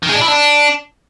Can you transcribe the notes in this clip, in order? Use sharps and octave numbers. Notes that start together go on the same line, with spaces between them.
D#3
G#3
D4
E4
D4